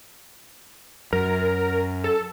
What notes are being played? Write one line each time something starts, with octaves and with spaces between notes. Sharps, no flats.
F#2 A#4
A4